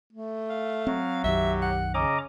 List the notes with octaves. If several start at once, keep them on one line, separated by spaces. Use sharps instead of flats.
A3
F5
F#3 C4
B1 F#2 D#3 G4 E5
F#5
C#3 C#4 D#5 A#5 D6